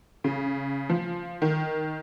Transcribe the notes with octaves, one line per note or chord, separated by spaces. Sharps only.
C#3
F3
D#3